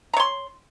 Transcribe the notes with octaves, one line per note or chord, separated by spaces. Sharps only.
C#5 A#5 C6